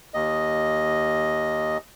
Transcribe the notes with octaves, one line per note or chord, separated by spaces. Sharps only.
D#2 D#5